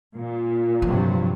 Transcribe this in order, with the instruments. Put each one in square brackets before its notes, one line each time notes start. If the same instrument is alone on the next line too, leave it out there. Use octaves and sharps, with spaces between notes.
[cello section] A#2
[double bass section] G2 C3 F#3 [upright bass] F3